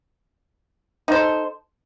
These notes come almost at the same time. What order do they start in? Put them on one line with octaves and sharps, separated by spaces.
D#4 C5 A4